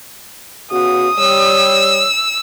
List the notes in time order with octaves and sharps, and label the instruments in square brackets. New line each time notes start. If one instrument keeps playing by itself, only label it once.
[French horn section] C#3 B3 F#4 [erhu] D#6
[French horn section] G3 C#5 [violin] E6